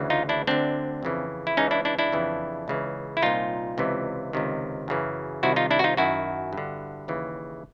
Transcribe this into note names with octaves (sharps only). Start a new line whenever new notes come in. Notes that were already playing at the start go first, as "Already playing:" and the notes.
Already playing: D2 C#3 E3
D#4 F4
D4 E4
D2 D3 C4 D4
F2 C#3 E3
E4
C#2 C#3 E3 C#4 D#4
D4 E4
D4 E4
D4 E4
F2 C#3 E3
C#2 C#3 E3
E4
C2 A#2 D#4 F4
C#2 C3 E3
C#2 C3 D#3
F#2 C#3 E3
C2 C3 D#3 E4 F#4
D#4 F4
D4 E4
F#4
D#4 F4
F#2 D#3 E4 F#4
G2 D3
D#2 C#3 E3